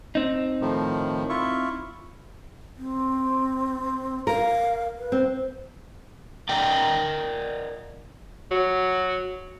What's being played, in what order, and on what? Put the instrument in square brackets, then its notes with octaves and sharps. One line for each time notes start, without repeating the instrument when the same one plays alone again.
[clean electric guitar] C4 D#4
[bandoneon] A2 D#3 F3
E4 F4 C#6
[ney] C4
[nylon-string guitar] A#4 [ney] F5
[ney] B4
[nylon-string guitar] C4
[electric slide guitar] A#4 D5 D#5 G5
[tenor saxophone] F#3